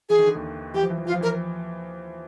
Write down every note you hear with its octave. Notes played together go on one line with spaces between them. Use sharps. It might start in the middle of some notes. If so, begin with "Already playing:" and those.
E3 G#4
D#3
D3
D#2 D#3
E3 G4
F3
E3
F3
E3 F4
F3
E3 A#4